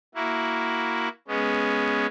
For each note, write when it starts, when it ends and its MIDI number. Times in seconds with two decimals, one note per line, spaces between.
0.15 1.08 58
0.15 1.08 64
0.15 1.08 66
1.28 2.06 56
1.28 2.06 59
1.28 2.06 61